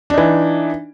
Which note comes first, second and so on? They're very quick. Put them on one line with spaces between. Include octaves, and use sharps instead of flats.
D4 D#4 E3